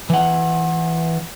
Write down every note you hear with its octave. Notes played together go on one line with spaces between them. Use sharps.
E3 F#5